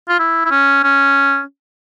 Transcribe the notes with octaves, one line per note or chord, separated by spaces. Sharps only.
F4
E4
E4
C#4
C#4